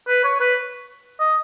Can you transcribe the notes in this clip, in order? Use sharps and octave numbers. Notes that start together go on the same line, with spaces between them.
B4
C#5
B4
D#5